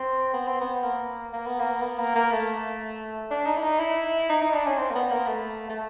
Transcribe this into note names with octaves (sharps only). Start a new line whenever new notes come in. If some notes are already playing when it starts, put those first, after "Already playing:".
Already playing: C4
B3
C4
B3
A#3
A#3
B3
A#3
B3
A#3
A#3
A3
D4
D#4
E4
D#4
E4
D#4
D#4
D4
C#4
C4
A#3
B3
A#3
A3
A3